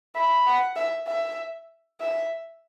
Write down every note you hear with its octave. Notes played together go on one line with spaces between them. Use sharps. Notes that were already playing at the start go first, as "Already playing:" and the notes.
E5 B5
F#5
E5
E5
E5